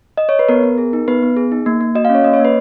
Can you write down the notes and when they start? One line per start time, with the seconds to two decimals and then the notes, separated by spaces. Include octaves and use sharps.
0.17 D#5
0.29 C#5
0.39 B4
0.49 B3 A#4
0.63 B3
0.78 G#4
0.93 D#4
1.08 B3 B4
1.22 B3
1.37 G#4
1.52 D#4
1.66 A#3
1.81 A#3
1.95 F#4 D#5
2.05 C#4 F5
2.15 C#5
2.24 A#3 D#5
2.34 C#5
2.40 A#3 B4